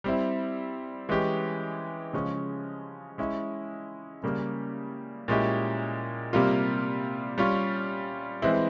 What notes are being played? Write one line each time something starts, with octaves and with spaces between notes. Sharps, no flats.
G3 C4 E4
E3 G#3 C#4 G4
C#3 F3 G#3 C#4
G#3 C#4 E4
C#3 G3 A#3 C#4
A#2 G#3 C#4 E4 G4
C3 G3 A#3 F4
G3 C#4 F4
E3 G#3 C4 E4